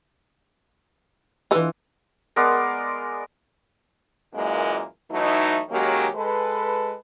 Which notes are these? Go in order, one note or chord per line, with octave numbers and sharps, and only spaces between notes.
E3 F4 A4 B4 D#5
G#3 B3 A#4 D5
F#2 A#2 E3 G#3 A#3
E3 F#3 A3 D#4
D#3 F#3 G#3 A#3 C#4 G4
G#3 A4 B4